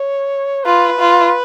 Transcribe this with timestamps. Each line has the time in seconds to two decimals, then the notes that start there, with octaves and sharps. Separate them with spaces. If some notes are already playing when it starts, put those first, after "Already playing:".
Already playing: C#5
0.64 F4 B4
0.99 F4